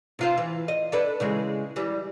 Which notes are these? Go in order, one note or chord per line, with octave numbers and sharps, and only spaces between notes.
C3 F4 C5
E3
D#5
D4 A4 B4
C#3 E3 G#3
E3 G3